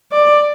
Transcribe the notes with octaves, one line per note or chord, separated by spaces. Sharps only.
D5